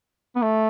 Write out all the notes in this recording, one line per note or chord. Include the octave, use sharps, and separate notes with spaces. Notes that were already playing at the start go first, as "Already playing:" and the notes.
B3
A3